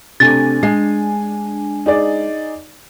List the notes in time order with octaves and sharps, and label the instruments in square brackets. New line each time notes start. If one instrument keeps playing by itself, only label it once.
[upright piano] C3 A3 [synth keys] D4 G#5 [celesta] A6
[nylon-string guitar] G#3 [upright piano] C7
[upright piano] D#4 G#4 D5